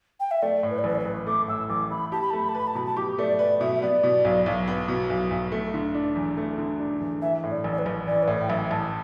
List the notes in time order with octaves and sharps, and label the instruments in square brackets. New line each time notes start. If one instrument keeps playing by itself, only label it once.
[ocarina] G5
E5
[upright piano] A3 [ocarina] D5
[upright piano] A2
[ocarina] B4
D5
[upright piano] A1 [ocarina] B4
[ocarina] D5
B4
[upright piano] A1
[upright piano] A3 [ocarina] D6
[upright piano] A2 [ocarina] E6
[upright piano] A1 [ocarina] D6
[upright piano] A1 [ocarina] B5
[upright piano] G4 [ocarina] A5
[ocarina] B5
[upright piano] A3 [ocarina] A5
[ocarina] B5
A5
[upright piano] B4 [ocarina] B5
[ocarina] A5
[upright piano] B2 [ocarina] B5
[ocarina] A5
[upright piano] G4 [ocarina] D6
[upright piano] A3 [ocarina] D5
[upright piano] B4 [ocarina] D5
[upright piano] B2 [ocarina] E5
[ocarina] E5
[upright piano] B3 [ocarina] D5
[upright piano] B2
B1
B1
B3
B2
B1
B1
A3
D3
D4
E2
A3
D3
D4
E2
[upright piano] E3 [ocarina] E5
[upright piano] A2
[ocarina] D5
[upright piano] A1
[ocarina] D5
B4
[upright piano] A1
[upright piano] E3 [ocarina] D5
[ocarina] B4
[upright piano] A2 [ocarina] D5
[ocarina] G5
[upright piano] A1 [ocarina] E5
[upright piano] A1 [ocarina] A5